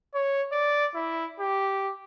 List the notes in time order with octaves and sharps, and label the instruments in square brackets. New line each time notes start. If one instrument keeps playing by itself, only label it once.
[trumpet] C#5
D5
E4
G4